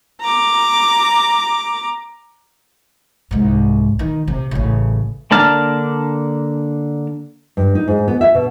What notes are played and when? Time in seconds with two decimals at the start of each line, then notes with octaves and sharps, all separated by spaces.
0.21 A#5 D6
3.31 C2 G#2
3.99 D#3
4.28 C3
4.51 A1 C#3
5.31 D3 A#3 D4 A5 F6
7.57 G2
7.75 D#4
7.88 G#2
8.08 B3
8.21 E5
8.35 B2